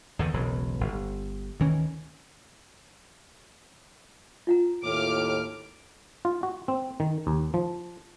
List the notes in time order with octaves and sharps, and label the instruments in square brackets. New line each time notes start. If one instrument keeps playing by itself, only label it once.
[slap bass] E2 D3 D#3
E1 B1 C#3 F#3
G1
D2 D#3 E3 C#4
[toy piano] F4 F#5 A#5
[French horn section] D#2 A2 [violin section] D6 F6
[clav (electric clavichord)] F4
F#4
C4
D#3
D#2
F3